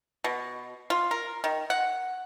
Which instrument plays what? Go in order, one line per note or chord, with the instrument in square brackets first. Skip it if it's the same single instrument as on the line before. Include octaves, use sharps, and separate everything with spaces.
[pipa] B2
F4
A#4
D#3
F#5